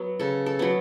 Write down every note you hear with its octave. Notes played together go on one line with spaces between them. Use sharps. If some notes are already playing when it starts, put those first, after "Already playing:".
Already playing: F#3 B3
C#3 A4
A4
F#3 B3